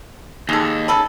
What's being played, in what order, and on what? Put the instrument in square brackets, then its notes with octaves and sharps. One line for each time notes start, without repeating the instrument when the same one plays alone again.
[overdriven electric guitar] D#2 [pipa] G#3 A4
[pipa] C#3 A4 B5